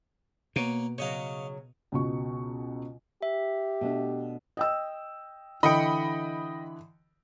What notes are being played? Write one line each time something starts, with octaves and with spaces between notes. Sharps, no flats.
B2 A#3 A#4 C#5
C#3 F#3 C#5 D#5 F5
C#2 B2 C#6
G4 E5
B2 A3 D4
D#5 G5 E6
D3 E3 D#5 G5 B5 D#6 C#7